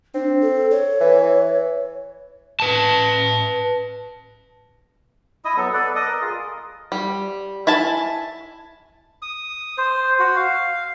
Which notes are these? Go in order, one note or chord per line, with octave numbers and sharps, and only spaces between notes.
C4 D4
A4
C#5
E3
B4 A5
E4 D#5 D#6
F#3 B3 A4
A4 B4 D5
D#5 D#6
A#4
F4 G#4
G3
E4 G#5 A5
D#6
C5
F#4
F5